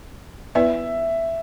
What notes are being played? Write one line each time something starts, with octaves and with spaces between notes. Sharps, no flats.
B3 E4 B4 D5 E5